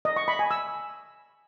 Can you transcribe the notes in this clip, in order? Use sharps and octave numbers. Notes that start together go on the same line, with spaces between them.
D#5
C#6
B5
G#5
E6